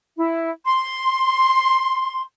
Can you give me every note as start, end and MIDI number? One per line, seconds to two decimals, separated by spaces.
0.16 0.50 64
0.65 2.21 84